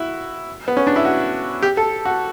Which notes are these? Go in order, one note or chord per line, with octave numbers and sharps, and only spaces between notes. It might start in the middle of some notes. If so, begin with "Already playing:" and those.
Already playing: E4 F#4
B3
C#4
D4
E4
F#4
G4
A4
F#4